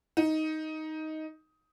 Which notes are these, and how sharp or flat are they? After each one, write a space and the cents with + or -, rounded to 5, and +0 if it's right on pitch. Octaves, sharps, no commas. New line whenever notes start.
D#4 +10